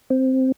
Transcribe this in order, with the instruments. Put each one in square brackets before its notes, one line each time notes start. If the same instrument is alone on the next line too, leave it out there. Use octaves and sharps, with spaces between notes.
[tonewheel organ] C4